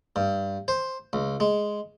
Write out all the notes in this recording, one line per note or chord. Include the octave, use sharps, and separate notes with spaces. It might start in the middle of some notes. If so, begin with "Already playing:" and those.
G2
C5
C#2
G#3